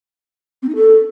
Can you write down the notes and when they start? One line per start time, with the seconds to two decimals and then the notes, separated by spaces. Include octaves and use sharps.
0.62 C4
0.69 D#4
0.75 A4